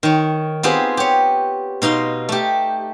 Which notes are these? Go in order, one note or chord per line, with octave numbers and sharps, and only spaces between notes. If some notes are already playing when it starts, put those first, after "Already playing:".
D#3 C#5
B3 C4 F4 G4 G#4
G4 C#5
B2 D#4 F5 C6
A3 G4